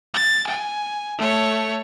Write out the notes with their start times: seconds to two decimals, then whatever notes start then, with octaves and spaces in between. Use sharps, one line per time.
0.14 A6
0.47 G#5
1.19 A3 C#5